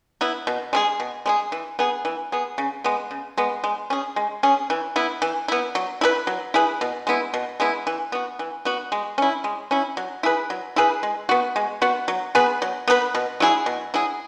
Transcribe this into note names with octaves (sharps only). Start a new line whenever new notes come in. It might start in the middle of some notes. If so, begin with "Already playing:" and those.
B3 E4
B2
G#3 C#4 G#4
B2
G#3 C#4 G#4
E3
B3 G#4
E3
B3 G#4
C#3
G#3 B3
C#3
G#3 B3
G#3
C#4 G#4
G#3
C#4 G#4
E3
B3 E4
E3
B3 E4
F#3
E4 G#4 B4
F#3
E4 G#4 B4
B2
G#3 B3 E4
B2
G#3 B3 E4
E3
B3 F#4
E3
B3 F#4
G#3
C#4 E4
G#3
C#4 E4
F#3
E4 G#4 B4
F#3
E4 G#4 B4
G#3
B3 F#4
G#3
B3 F#4
F#3
B3 G#4 B4
F#3
B3 G#4 B4
B2
F#3 E4 G#4
B2
F#3 E4 G#4